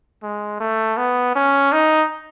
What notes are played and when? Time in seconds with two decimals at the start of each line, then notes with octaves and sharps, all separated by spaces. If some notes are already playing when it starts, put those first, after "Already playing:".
0.23 G#3
0.60 A3
0.97 B3
1.35 C#4
1.72 D#4